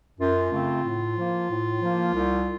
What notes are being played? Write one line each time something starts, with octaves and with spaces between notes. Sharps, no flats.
F#2 F4
C#3 A3 C4
A2
F3 A#3
A2
F3 A#3
C2